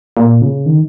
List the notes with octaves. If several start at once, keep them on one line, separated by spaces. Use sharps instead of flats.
A#2
C#3
D#3